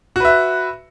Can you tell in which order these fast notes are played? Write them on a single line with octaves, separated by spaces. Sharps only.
F#4 B4 E5